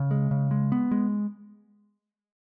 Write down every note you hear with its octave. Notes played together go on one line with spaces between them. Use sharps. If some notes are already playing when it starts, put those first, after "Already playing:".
Already playing: C#3
G#3
C#3
G#3
B3
G#3